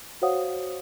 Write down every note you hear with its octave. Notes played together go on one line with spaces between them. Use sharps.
F#4 C5 C#5 F5 F#5 D#6